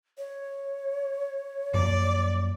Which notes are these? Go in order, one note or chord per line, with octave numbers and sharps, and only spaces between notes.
C#5
F#2 F3 A#3 D5